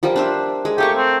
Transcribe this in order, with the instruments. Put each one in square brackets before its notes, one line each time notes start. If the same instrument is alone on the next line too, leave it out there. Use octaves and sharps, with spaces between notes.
[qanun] F3 G3 A#3
D4 C5 E5
G#3
[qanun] A3 A#3 C#6 [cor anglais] G4
[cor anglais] C4